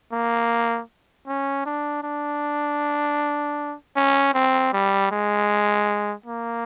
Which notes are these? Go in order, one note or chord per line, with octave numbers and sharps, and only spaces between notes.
A#3
C#4
D4
D4
C#4
C4
G3
G#3
A#3